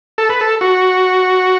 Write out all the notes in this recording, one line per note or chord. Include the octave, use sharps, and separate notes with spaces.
A4
B4
A4
F#4